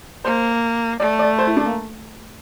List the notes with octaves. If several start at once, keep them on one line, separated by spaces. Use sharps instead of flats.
A#3 C5
A3 D5
D5
C5
E4
D4
A#3